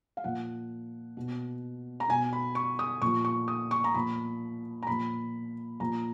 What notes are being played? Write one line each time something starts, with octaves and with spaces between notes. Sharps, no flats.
F5
A#2 F3 F#5
B2
A#5
B2 G#5
B5
C#6
D#6
A#2 F3 C#6
C#6
D#6
C#6
A#5
A#2 F3 B5
A#5
A#2 F3 B5
A#2 F3 A#5